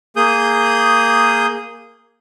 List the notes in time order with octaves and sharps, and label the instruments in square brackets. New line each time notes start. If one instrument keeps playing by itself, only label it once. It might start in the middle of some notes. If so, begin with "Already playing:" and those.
[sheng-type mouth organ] A#3 G#4 D#6 G6